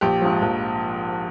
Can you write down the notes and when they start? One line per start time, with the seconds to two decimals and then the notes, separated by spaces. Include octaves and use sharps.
0.01 A#1 G4
0.21 G#2 F3
0.42 A#1